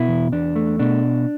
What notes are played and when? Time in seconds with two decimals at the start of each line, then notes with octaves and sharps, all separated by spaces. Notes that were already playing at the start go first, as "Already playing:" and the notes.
Already playing: B2 E4
0.08 E2
0.32 E2 D4
0.56 A3
0.79 B2 D4